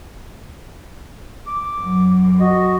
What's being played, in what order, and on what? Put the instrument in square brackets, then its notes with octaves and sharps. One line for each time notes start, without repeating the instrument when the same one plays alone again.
[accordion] D6
[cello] F#2
[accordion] F#4 D#5